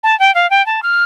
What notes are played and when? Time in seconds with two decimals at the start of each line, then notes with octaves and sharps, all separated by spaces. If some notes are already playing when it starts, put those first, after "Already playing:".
0.04 A5
0.19 G5
0.35 F5
0.50 G5
0.66 A5
0.83 F6